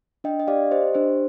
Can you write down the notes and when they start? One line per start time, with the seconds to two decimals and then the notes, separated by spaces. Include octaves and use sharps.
0.24 D4 D#5 G5
0.40 D#5
0.47 G4 D5 F5
0.71 G4 C5 D#5
0.94 D4 C5